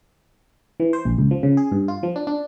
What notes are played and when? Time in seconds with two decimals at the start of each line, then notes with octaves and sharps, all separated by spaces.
0.80 E3
0.93 C5
1.05 A#1
1.18 C#2
1.31 F3
1.43 C#3
1.57 G#4
1.72 G2
1.88 F4
2.03 F3
2.16 D4
2.27 D4